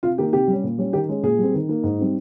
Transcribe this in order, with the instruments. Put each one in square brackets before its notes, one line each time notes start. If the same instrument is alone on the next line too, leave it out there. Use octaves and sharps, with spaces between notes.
[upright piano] C3 F4
D#3 A#3 D#4 G4
C3 G4
G3 C#4
A#2
G3 C#4
D#3 G4
G#3 C#4
A#2 G#4
G3 C4
D#3
A#3 D#4
G#2
G3 C4 D#4